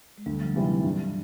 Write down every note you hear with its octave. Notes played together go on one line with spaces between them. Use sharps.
G#3
D2 G3
F3
F#3
C3 E3 G3
F3
G2